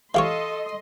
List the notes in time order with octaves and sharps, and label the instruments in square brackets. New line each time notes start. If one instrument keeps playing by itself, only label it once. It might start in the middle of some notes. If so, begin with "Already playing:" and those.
[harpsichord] E3 G4 C#5 [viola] A4 [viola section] D#5 C6 [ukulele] F5